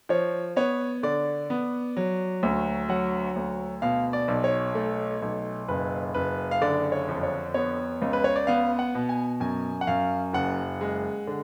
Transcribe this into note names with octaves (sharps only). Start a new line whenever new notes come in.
F3 C#5
B3 C#5
D3 D5
B3
F#3
D2
F#3 F#5
D2
B2 F5
D5
B1
C#5
A3
B1
F#1 B4
F#1 B4
F5
D3 D5
C#5
F2
C#5
B3 C#5
C#2
B4
C#5
D5
B3 F5
F#5
B2
G#5
F#2 G#5
F#5
F#2 F5
F#1 F#5
G#3
D3